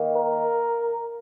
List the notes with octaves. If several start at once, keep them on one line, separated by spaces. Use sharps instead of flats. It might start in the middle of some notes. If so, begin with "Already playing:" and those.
Already playing: D#3 A#3
A#4